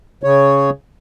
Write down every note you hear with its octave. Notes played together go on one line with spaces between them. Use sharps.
C#3 C#5